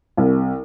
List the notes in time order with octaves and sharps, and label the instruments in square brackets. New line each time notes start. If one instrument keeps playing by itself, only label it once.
[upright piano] C2